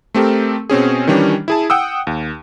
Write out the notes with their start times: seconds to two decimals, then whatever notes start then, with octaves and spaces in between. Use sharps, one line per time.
0.15 A3 C4 G4 A4 A#4
0.70 B2 C4 C#4 G#4
1.07 D#3 E3 G3 C#4 D4 G4
1.48 E4 G#4 A5
1.70 F#5 G5 D#6 E6
2.07 D#2